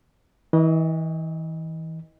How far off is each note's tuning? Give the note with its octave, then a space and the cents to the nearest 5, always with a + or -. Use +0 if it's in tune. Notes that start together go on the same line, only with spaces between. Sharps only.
E3 -35 D#5 +0